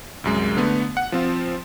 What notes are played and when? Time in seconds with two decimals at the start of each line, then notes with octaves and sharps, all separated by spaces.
0.24 C2 F#2 G#3
0.57 D3 A3 B3
0.97 F#5
1.12 F3 C4 F4